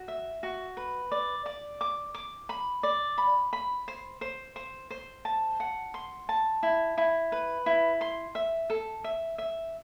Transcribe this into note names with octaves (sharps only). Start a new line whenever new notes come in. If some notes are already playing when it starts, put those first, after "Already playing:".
Already playing: F#4
E5
F#4
B4
D5
D5
D6
D6
B5
D5
B5
B5
C5
C5
C5
C5
A5
F#5
C6
A5
E4
E4
B4
E4
C6
E5
A4
E5
E5